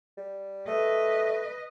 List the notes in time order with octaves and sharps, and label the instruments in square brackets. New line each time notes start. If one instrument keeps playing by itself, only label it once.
[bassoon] G3
[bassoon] A3 [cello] B4 D#5